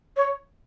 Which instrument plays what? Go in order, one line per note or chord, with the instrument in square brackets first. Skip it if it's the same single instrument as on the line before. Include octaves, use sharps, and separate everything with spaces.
[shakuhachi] C#5